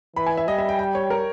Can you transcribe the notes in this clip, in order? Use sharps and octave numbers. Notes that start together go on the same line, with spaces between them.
E3 B5
G#5
E5
G3 D#5
E5
G5
G5
C#5
A#4